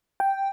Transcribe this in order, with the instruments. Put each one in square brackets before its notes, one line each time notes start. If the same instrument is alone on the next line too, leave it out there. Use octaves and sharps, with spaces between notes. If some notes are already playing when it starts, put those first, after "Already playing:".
[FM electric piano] G5